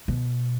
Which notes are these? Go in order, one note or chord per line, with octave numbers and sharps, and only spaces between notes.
B2